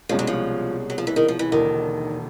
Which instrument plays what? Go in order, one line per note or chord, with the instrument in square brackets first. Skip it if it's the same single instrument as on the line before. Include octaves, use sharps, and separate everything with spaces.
[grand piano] C2 B2 G#3 C#4 [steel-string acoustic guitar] F3
[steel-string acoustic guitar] F#3
F3
F#3
F3
E3
D#3
F3
E3
[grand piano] E1 D#2 D3 [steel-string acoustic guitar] D#3